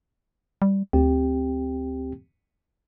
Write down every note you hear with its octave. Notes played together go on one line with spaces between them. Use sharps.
G3
D2 C4 G4 G5